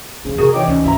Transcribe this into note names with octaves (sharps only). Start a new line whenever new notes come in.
F2 C#3 C4
C3 F#4 G#4 A#4 D#6
E3 D#4 C#5 D5 G5 D6
D2 C#4
G#1 D3 E4 E5 A#5